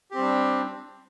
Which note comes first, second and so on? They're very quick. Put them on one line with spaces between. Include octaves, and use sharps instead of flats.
G4 C4 G3 D4